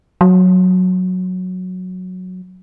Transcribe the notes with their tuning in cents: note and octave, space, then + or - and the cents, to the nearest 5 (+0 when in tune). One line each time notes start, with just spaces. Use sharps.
F#3 -10